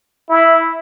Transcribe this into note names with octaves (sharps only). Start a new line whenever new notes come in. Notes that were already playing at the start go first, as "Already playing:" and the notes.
E4